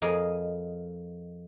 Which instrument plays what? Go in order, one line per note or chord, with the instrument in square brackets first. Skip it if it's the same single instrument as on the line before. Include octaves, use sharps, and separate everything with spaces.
[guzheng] F2 G#4 A#4 D#5